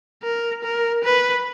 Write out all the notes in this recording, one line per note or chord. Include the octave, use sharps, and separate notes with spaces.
A#4
A#4
B4